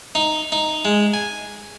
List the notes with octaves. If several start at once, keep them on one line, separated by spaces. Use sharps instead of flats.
D#4
D#4
G#3
G#5